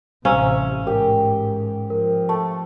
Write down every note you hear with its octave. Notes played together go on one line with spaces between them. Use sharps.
A1 C3 C#4 F5 A#5 E6
G#2 G4 A#4 G5
F3 A#4
A3 A5